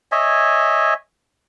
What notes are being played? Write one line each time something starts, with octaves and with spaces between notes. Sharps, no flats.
C#5 D#5 E5 G#5